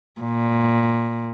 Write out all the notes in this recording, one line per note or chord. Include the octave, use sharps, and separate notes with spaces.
A#2